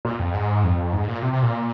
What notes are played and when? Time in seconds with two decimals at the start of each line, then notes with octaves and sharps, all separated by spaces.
0.05 A#2
0.19 F2
0.34 G#2
0.64 F2
0.93 G#2
1.08 A#2
1.22 C3
1.33 C3
1.43 A#2